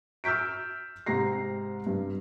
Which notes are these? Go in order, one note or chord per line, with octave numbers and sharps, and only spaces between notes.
E6 F6 G6 B6 D7
G#2 C3 A#5 A#6 C7
G2